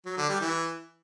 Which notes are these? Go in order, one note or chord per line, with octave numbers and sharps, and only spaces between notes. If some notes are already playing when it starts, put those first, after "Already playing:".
F#3
D3
G3
E3